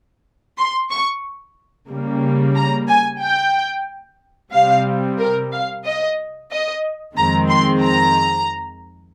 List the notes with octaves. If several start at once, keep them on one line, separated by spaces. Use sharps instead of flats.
C6
C#6
C#3 G3 A#3
A#5
G#5
G5
C3 G3 C4 F5
A#4
F5
D#5
D#5
F2 D#3 G#3 C4 A#5
C6
A#5